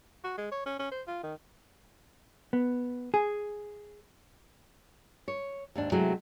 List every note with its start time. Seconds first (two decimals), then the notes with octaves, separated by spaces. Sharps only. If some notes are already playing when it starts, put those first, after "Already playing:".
0.24 F#4
0.38 G#3
0.52 C#5
0.66 C#4
0.79 C#4
0.92 C5
1.07 F4
1.23 D#3
2.53 B3
3.14 G#4
5.28 C#5
5.75 D#2 G#2 D4
5.92 C3 F#3 G#3 A3 E4